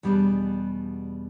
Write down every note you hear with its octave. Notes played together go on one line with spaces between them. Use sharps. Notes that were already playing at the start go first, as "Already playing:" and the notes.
E2 B2 G3 B3 D4